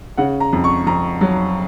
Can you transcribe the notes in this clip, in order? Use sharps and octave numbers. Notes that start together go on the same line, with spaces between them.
C#3 F#5
A#5
F2
C#6
F2 A#5
F#3